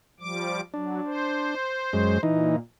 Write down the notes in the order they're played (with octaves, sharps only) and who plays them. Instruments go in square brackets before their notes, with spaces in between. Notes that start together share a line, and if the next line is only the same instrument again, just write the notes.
[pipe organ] F3 G3 D6
[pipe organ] F#3 [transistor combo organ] D4
[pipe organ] C5
[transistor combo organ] F#2 G#3
[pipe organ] A#2 [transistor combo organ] E3 D#4